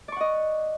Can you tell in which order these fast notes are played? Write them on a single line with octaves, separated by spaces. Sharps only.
D5 C#6 F#5 D#5